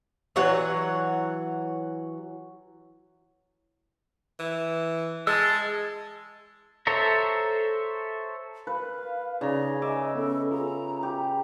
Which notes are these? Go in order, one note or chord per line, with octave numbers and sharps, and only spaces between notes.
E3 F#3 C#5 F#5
E3
G#3 A5 E6
A4 C5 C#5 E5 A#5
B4 F5
C#3 D#4 G#4 D5 A#5
D#5 E5 G#5 D6
B3 C#4 A4
F4 G#4 A#5
G4